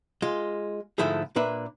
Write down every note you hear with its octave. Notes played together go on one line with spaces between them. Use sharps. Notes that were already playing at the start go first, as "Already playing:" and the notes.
G#3 F4
G#2 D3 F3 A3 E4 G#4
A#2 A#3 D4 B4 E5